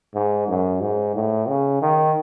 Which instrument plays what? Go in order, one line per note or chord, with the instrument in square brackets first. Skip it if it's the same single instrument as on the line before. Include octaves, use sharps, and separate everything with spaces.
[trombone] G#2
F#2
G#2
A2
C#3
D#3